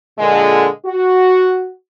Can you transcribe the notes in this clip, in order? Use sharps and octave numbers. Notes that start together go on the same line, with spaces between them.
A#2 D3 G#3
F#4